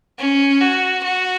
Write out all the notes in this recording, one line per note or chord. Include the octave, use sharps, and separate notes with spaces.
C#4
F#4
F#4